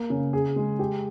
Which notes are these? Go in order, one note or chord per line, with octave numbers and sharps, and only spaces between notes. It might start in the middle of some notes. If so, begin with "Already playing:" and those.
Already playing: A#3
C#3
G#4
G#3
G4